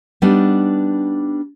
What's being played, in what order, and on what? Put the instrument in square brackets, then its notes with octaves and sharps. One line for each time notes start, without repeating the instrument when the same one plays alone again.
[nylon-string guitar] G3 B3 D4 D#4